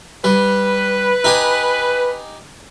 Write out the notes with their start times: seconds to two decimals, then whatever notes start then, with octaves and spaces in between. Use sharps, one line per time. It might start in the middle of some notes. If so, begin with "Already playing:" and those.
0.24 G3 B4
1.24 D#4 G4 G#5